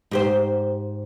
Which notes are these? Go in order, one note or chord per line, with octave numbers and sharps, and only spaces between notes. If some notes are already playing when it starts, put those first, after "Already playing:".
G#2 G4 C5